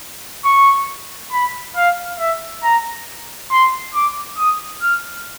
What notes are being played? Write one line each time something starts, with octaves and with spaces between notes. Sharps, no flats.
C#6
B5
F5
E5
A#5
C6
D6
D#6
F6